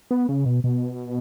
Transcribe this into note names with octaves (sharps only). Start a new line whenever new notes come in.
B3
C#3
B2
B2